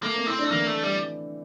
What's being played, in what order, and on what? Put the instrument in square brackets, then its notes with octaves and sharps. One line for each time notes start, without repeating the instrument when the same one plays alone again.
[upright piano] A3 [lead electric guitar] A#3
[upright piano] C4
[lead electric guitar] C4 [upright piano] E4
[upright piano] D4
[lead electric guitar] A3
[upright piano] E3 [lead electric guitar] A#3
[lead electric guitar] A3
G3